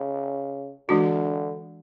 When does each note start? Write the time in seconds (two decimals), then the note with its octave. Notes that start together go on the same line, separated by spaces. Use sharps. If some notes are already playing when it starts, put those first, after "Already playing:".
Already playing: C#3
0.89 D3 E3 G#3 D4 F#4